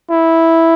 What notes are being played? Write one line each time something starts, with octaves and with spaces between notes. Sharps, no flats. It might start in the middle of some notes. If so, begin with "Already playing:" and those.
E4